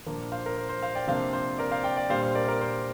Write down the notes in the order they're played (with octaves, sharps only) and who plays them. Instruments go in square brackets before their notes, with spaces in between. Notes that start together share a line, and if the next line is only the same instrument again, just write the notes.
[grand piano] A#2 F3 A#3 D4
C5 F5
A#4
C5
C5
C5 F5
D5 G5
C3 F3 A#3 D4 C5 F5
C5
A#4 D5
C5 F5
D5 G5
D5 G5
A#2 G3 A#3 D4 C5 F5
C5
A#4 D5
A#4 D5
C5